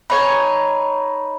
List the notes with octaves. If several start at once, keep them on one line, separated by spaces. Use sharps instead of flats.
D#4 C#5 G#5 B5